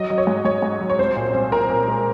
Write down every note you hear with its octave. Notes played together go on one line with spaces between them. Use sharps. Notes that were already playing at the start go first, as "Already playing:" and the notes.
Already playing: F#3 D#5
F#3
C#5
G#2
G#2 C#5
G#2
F#3
C#5
C2 C5
A#2
C2
A#2 A#4
A#2
G#3